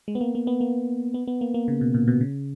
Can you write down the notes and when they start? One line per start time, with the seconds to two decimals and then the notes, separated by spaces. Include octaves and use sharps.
0.08 G#3
0.15 B3
0.21 A#3
0.35 A#3
0.47 B3
0.61 A#3
1.14 B3
1.27 B3
1.41 A#3
1.54 A#3
1.68 C#3
1.81 B2
1.94 A#2
2.08 B2
2.21 C#3